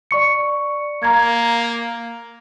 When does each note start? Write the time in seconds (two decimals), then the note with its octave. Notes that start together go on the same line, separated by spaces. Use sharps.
0.11 D5 C#6 C#7
1.03 A#3 A#5 G#6